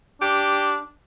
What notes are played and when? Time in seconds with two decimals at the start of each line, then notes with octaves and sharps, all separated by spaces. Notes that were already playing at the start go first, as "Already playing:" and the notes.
0.22 D4 G4